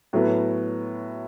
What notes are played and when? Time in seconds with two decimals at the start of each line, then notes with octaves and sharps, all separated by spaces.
0.13 A2 F#3 B3